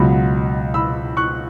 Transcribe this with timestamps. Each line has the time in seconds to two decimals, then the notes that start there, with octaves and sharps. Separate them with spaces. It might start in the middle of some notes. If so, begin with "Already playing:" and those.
Already playing: C#2 B2 F#3 F#5 B5
0.74 B5 E6
1.17 C#6 F#6